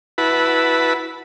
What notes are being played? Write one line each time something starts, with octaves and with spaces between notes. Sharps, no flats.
E4 F#4 B4 A5 B5